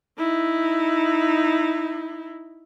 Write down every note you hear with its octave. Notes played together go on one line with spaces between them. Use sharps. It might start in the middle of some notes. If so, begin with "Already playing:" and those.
D#4 E4